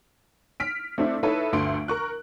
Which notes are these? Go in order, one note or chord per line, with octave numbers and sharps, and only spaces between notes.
F6 B6 D7
A3 C4 D4 E4
D#4 E4 A4 B4 C#5 E5
G1 D2 A3 C6 D7
A#4 C#6 F#6